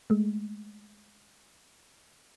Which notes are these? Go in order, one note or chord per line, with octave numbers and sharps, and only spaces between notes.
G#3 A3